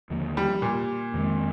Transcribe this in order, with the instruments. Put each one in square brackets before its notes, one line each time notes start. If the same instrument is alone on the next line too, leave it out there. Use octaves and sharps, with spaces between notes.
[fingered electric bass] D#2 D3 F3 A#3
[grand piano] G3
A#2
[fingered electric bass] F2 D#3 G#3 C4